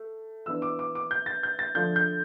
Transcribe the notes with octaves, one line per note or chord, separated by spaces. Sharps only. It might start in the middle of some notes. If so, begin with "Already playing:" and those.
Already playing: A3
E3 B3 D4 E6
D6
D6
D6
G6
A6
G6
A6
D3 F3 A3 D4 G6
G6